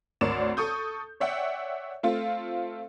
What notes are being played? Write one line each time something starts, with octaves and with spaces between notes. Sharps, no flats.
G#1 D2 A#4 C#5 D5 E7
A4 C#6 D#6 G6
C#5 D5 E5 F#5 G5
A3 C4 F4